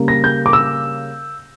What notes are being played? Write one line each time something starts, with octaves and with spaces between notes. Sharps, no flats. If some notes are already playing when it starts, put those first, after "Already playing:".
Already playing: C#3 G3 A#3
A#6
G6
D6
E6